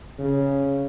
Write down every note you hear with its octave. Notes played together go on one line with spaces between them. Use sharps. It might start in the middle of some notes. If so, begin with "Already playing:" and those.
C#3